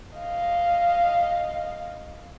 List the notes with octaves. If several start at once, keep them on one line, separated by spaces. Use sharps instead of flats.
D#5 F5